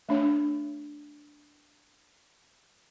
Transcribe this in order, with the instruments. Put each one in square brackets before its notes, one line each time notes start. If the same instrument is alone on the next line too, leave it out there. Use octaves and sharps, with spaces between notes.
[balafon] A3 D4 C#5